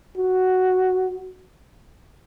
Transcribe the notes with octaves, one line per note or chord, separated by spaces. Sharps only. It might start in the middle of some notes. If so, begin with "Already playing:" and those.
F#4